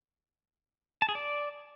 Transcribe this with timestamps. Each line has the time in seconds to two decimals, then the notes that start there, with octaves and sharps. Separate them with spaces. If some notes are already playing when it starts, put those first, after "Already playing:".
1.02 A5
1.09 G#4
1.15 D5